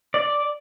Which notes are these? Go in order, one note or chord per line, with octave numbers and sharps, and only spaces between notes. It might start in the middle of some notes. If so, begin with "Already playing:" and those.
D5